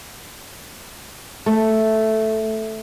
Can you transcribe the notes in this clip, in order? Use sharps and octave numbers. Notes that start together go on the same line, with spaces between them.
A3